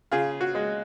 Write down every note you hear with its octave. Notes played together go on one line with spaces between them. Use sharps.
C#3 F4 G#4
F#4
G#3